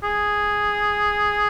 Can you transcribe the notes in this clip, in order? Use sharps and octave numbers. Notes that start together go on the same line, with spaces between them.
G#4